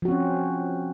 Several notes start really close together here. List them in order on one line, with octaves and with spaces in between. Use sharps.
F3 F#4 C4 C#4